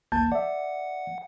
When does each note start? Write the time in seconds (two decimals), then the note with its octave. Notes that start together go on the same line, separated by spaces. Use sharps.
0.12 G#1 D#2 A#3 A5 G6
0.32 D5 E5 F#5